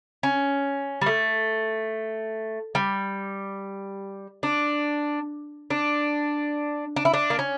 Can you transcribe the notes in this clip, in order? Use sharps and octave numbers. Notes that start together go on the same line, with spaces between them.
C#4
G3
A3
G3
D4
D4
D4
E4
D4
A#3
C#4